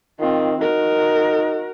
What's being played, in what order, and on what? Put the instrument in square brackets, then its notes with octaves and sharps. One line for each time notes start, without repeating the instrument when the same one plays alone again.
[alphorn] D#3 [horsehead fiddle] C4 F4
[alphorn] D#4 [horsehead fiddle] F#4 A#4